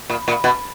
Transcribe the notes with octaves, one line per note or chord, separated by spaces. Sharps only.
A#2
A#2
B2